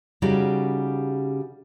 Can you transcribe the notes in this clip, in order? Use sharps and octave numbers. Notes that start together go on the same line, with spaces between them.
C#3 G3 C#4 D#4 F#4 G4